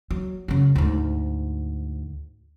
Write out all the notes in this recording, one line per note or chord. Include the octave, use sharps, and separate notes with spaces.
F#3
F#2 C#3
D2 G#2